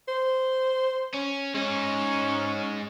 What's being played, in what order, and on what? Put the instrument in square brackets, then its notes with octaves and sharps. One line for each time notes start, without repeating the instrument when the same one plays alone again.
[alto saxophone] C5
[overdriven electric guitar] C#4
[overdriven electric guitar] G#3 D#4 [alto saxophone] C#4